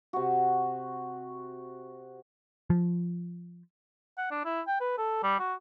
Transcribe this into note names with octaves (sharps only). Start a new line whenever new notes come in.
C3 F#4
F3
F#5
D4
E4
G5
B4
A4
G3
F#4